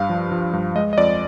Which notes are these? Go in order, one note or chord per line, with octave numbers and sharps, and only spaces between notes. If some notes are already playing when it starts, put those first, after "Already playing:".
Already playing: G2 F5
F3
F3
G2
G#3 D#5
D#5
F2 D5